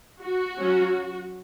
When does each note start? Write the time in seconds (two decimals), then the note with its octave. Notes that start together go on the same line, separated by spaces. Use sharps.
0.23 F#4
0.59 F#3 C#4